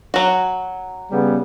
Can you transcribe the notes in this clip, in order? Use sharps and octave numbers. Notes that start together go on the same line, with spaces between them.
F#3 F#4
C#3 G3 B3